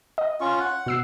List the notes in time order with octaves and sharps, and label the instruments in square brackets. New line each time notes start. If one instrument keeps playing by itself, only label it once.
[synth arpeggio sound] D#5
[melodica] C#4 F4 C#6
F#5
[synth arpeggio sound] B2 E6 C7